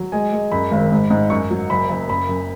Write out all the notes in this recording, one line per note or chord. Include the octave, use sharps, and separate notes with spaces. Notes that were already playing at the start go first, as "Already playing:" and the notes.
Already playing: F#3
G#3 G#5
G#3
F#2 B5
G#1
G#2
G#2
F#2 C#6
F#3
F#1 B5
F#1
F#2 B5
F#2